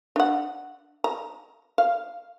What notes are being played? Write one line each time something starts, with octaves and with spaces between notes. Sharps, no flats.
D4 F#5
A#5
F5